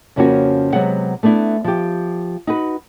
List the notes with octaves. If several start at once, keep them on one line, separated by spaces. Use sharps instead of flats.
F2 C#3 F3 A#3 C#4 F#4
C3 D#3 F#3 G#3 B3 F#5
A3 B3 D4 E4
F3 G4
D#4 F#4 B4